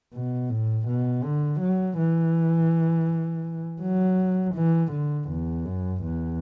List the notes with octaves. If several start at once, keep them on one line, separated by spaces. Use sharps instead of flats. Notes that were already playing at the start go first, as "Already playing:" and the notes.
B2
A2
B2
D3
F#3
E3
F#3
E3
D3
E2
F#2
E2